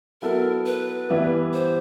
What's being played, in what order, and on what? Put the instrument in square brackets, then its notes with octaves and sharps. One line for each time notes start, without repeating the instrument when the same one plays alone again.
[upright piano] F#3 B3 E4 A4 [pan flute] A#4
[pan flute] B4
[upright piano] E3 G3 B3 E4 G4
[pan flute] C5